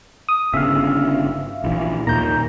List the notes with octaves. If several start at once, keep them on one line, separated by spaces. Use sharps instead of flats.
D#6
G1 C#3 E5 F5
A#1 E3
D#2 A#2 A#5 G6